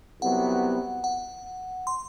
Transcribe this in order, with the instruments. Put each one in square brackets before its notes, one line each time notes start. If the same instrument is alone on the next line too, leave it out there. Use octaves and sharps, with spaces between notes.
[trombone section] C2 C3 F#3 B3 [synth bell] F#5
[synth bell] F#5
C6